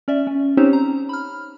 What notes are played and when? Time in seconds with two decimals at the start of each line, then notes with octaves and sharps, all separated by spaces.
0.08 C#4 D5 E5
0.27 C#4
0.57 C4 C#4 D#4 G4 C5 C#5
0.73 A#5
1.09 B5 F6